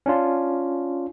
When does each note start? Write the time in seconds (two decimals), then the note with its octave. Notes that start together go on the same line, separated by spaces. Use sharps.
0.06 C#4 D4 F4